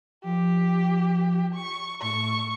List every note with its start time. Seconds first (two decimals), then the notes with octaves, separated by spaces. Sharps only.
0.24 F3 G4
1.54 C#6
2.02 A2 C#6